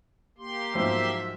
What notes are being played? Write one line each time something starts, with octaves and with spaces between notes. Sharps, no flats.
A#3 G4 C6
G#2 F3 F#3 E5